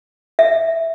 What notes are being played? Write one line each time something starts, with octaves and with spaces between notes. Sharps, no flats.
E5